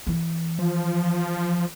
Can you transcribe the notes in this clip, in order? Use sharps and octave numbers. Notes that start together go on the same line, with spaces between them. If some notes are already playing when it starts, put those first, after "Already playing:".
E3
F3